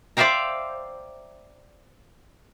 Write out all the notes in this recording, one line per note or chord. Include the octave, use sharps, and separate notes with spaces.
C5 D5 E5 F5 G5 A#5